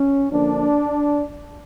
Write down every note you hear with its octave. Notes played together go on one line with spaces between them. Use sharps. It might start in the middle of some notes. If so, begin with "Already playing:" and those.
Already playing: C#4
D3 F3 A#3 D4